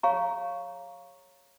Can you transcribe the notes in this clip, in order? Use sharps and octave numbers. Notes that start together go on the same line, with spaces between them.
G#4 C#5 F5 A#5 C#6